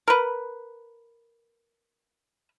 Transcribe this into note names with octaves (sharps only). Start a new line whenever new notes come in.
A#4 B4